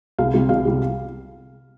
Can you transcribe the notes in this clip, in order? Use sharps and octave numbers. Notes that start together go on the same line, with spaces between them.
C2 F5
C3 G3
C2 F5
C3 G3